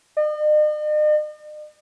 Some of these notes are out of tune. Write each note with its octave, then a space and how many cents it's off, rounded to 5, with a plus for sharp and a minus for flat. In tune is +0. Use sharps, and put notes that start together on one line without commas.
D#5 -45